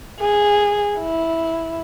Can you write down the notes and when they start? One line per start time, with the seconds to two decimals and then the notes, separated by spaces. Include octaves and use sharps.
0.20 G#4
0.99 E4